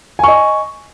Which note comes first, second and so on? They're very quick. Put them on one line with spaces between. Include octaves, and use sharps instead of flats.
G#5 C#6 D#5